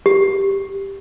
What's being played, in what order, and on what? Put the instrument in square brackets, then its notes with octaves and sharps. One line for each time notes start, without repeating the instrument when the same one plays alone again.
[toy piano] G4